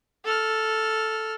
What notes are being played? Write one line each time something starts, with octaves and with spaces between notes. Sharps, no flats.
A4 F6